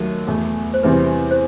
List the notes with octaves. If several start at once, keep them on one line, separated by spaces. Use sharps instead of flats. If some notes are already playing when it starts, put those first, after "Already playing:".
Already playing: D#2 D#3 F#3 A3
E2 B2 A3
C5
E2 C3 E3 G3 C4 B4
C5